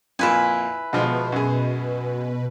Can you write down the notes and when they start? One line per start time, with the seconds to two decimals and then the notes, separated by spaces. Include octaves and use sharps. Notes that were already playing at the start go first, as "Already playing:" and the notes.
0.19 F2 A#2 E4 B4 G#5
0.93 B2 D3 F3 G#3
1.32 F#2 G#4